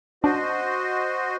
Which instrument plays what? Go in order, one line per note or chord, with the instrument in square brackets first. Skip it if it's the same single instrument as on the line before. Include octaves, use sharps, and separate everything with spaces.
[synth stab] D4 [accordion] F#4 C5 D#5